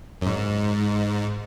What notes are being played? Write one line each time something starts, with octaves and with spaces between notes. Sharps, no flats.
F#2
G#2